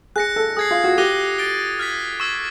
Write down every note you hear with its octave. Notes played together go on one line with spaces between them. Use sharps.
G#4 F#6 A#6 C#7
A4
G#4 D#6 G#6 C7
F4
F#4
G4 D6 F#6 A#6 D#7 G7
A6 D7 G7
F6 G#6 B6
C#6 E6 G#6 B6